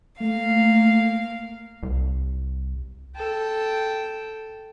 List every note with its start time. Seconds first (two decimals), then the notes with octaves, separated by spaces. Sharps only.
0.20 A3 A#3 F5
1.83 C2
3.16 A4 G5